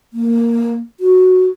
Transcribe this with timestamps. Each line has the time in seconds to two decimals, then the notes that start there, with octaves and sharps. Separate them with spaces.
0.13 A#3
1.00 F#4